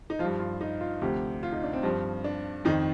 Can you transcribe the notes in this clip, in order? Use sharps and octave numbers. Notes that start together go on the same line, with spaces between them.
D#4
F3 F4
G2
F4
D#4
F4
D2 C3 F3 G4
F4
D#4
D4
C4
G2 F3
D4
F2 D#3 D#4